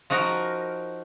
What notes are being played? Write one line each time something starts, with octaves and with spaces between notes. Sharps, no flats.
F3 D#4 F#4 A#4